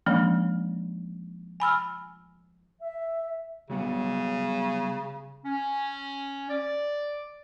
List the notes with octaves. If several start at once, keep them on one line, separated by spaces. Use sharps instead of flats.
E3 F3 G#3 A#3 C#4 D4
G#5 B5 E6 F6
E5
C#3 F#3 G3 B3
C#4
D5